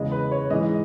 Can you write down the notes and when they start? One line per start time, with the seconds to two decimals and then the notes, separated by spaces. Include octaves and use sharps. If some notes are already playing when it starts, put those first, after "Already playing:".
Already playing: E2 C#3 G#3 D#5
0.12 B4
0.32 C#5
0.50 G#2 E3 G#3 D#5